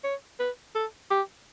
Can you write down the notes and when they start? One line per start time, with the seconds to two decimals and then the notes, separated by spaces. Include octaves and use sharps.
0.04 C#5
0.39 B4
0.75 A4
1.11 G4